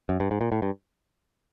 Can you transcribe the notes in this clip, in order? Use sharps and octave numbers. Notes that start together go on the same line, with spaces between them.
F#2
G2
G#2
A#2
A2
G2